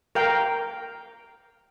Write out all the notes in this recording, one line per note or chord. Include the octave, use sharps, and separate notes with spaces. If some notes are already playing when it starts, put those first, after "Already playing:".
A#4 F5 G5